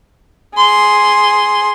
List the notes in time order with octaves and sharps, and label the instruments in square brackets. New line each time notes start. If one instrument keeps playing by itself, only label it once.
[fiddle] G#4 C6